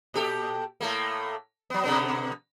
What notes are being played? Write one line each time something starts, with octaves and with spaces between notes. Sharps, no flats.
A#2 G4 A4
A2 A3 A#3
F#3 B3
B2 D3 B3